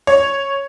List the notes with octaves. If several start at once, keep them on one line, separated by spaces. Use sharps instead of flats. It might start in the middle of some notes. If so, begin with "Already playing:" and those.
C#5